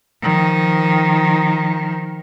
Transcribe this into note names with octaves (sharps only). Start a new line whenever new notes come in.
D#3 F3